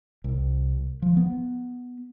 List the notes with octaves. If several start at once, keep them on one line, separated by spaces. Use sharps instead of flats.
C2
F3
B3